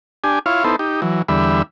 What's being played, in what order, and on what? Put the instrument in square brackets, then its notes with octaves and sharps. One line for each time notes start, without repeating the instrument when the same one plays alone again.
[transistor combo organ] D4 G4 G#5
E4 F4 C#5 F5
B3 D#4 E4 A4 C5
D#4 G4
E3 F#3
E2 D3 G3 E5 B5